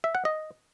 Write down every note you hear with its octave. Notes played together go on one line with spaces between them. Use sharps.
E5
F#5
D#5